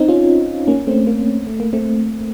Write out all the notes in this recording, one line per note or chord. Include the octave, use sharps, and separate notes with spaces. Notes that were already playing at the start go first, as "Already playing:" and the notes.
Already playing: C4 D#4
C#4 F4
A#3 C#4
A3 C4
A#3
A3
A#3
A3 C4